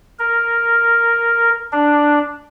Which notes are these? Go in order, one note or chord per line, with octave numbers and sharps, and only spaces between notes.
A#4
D4